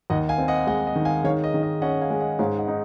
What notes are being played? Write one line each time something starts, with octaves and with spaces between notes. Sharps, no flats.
D#2 D#5 F#5
F5 G#5
C4
D#5 F#5
G#3 D#5 F#5
D#5
D#3
F5 G#5
D#3 C#5 F5
D#5
D#3
D#5
C#4 D#5 F#5
F5 G#5
G#3
D#5 F#5
G#2 C#5 F5
D#5 F#5
D#4